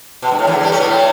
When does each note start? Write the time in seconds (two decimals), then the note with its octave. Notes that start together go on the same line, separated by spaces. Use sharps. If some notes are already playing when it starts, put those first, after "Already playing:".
0.22 B2
0.31 G2
0.39 A2
0.47 E2 E3
0.55 D3
0.63 G2 G3
0.72 A2 A3
0.80 B2 B3
0.88 A2 A3